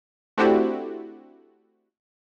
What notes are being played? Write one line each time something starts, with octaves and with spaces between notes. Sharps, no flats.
A3 C4 D4 E4 F#4 G4